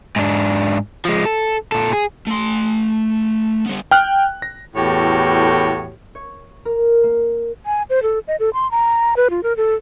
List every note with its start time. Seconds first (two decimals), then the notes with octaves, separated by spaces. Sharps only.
0.16 G#2 D4
1.05 F3 G#3
1.25 A4
1.72 A#2 A4
1.93 G#4
2.27 A3 C6
3.66 G3 B3
3.91 G5 F6 F#6
4.42 A#6
4.76 E2 A2 F#4 G4 A4 C#5
6.15 C#5
6.65 A#4
7.03 A#3
7.66 G#5
7.90 C5
8.03 A4
8.28 D#5
8.40 A4
8.54 C6
8.71 A#5
9.17 B4
9.30 F4
9.43 A#4
9.57 A4